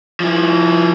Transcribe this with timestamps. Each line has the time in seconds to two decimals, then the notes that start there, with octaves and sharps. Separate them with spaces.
0.20 F3 E4